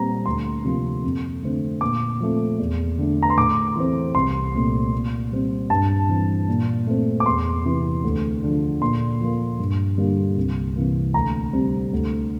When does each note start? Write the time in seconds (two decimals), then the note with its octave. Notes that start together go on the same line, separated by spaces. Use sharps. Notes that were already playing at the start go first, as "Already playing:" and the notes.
Already playing: A#2 G3 C4 A#5
0.26 D2 C6
0.64 C3 F3 A#3
1.04 F2
1.43 D3 A3 C4
1.81 A#2 D6
2.20 F3 A3 C4
2.59 E2
2.98 D3 A3
3.22 A#5
3.30 C6
3.37 A2 D6
3.76 E3 A3 C4
4.15 C2 C6
4.54 A#2 A3 C4
4.93 A#2
5.32 G3 C4
5.70 G2 A5
6.09 E3 G3 C4
6.48 A#2
6.87 A3 C4
7.20 D6
7.26 E2 C6
7.65 C3 E3
8.03 D2
8.43 D3 F3
8.81 A#2 C6
9.21 F3 A#3
9.59 G2
9.98 D3 G3 A#3
10.37 C2
10.76 C3 E3 A#3
11.14 D2 A#5
11.53 C3 G3 C4
11.93 D2